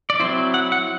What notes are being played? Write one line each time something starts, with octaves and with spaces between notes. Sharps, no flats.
D5
F#3 C4 E4 C5
F#5
F#5